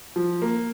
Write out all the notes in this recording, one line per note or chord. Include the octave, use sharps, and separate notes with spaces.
F3
A#3